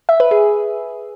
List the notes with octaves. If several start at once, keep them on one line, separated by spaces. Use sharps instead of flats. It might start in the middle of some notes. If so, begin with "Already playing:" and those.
E5
B4
G#4